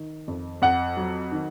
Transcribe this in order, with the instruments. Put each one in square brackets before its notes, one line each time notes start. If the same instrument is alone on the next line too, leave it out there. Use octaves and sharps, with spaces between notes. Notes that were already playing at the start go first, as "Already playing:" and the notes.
Already playing: [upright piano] D#3
F2
F2 F#5
F#3
D#3